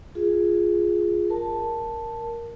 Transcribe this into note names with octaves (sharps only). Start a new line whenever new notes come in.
F4 G#4
A#4 A5